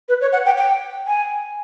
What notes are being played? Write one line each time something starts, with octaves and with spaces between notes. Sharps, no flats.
B4
C#5
F#5
G5
G5
G#5